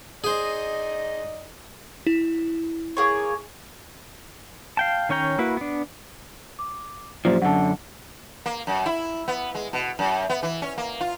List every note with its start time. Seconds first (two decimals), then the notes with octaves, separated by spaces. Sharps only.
0.24 D#4 G#4 C5 D5 D#5
2.07 E4
2.97 A#3 G#4 C#5
4.77 F5 G5 A5
5.09 D#3 C#4 C#5 G5 A#5
5.38 A#3 E4 F#4 B4
5.57 B3 D4
6.59 D6
7.25 F#2 A#2 F3 G4 C5 D5
7.42 F#2 D3 F#5 A5
8.46 A#3
8.67 F#2
8.86 E4
9.28 B3
9.55 G#3
9.73 B2
9.99 F#2
10.29 B3
10.43 E3
10.62 C#4
10.78 A#3
11.01 F4